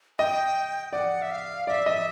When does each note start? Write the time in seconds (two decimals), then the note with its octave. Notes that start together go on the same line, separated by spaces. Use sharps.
0.19 D#5 G5
0.93 D5 F#5
1.22 E5
1.31 F5
1.67 D5 E5
1.86 D#5